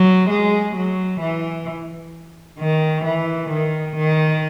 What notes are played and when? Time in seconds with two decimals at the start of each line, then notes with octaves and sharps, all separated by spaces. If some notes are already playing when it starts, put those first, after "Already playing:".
Already playing: F#3
0.30 G#3
0.75 F#3
1.21 E3
2.59 D#3
3.04 E3
3.50 D#3
3.96 D#3